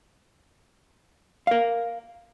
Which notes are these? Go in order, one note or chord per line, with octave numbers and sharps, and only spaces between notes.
A#4 F5